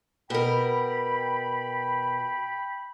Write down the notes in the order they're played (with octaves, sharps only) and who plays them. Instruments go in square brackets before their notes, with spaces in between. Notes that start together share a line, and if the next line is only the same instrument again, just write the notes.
[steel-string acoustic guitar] B2 A#4 [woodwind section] G5 B5